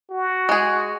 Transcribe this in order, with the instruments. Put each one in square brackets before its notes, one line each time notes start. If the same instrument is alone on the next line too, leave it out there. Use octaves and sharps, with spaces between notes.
[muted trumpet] F#4
[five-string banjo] G#3 G#4